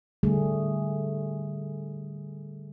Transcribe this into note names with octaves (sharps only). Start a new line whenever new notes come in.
D3 G3 A3 G#4